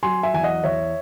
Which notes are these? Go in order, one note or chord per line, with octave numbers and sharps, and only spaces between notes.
F#3 G#5 C6
E5 G#5
E2 G#5
D#5 F#5
E2 C#5 E5